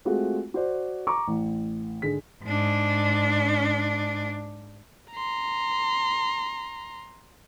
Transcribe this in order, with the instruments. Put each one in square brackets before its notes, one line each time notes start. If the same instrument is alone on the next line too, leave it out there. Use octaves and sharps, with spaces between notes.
[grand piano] G#3 A3 C4 F4 F#4
F#4 C5 D5
A#5 C#6 D6
A1
G#2 D3 G#3 B6
[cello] G#2 D4
[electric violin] A#5 C6